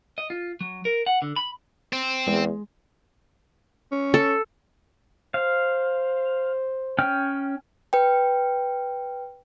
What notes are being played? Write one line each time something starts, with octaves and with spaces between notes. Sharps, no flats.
D#5
F4
F#3
A#4
F#5
D3
B5
C4
E2 G#3
C#4
A4
C5 F5
C#4 G5 F6
B4 G5